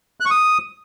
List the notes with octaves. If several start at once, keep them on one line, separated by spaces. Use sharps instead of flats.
F#6
C#6
D#6